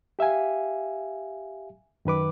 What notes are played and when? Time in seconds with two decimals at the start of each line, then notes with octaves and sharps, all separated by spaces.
0.19 G4 E5 F5 G#5
2.05 F#2 D#3 B4 D6